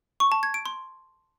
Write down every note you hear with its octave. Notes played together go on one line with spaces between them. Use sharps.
C#6
A5
G#6
D7
C6